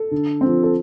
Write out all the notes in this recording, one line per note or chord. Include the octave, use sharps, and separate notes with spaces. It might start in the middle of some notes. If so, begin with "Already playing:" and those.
Already playing: A4
D3
F3 C4
A4